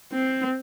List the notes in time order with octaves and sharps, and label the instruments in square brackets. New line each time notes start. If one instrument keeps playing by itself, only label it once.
[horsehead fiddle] C4